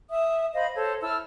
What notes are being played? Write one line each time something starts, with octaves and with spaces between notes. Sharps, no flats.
E5 D#6
C5 D#5 F5 B5
A4 C5 C#5
E4 A5 E6 F6